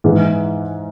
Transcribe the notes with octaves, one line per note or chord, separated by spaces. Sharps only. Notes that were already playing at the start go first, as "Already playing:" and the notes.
G#2 E3 G#3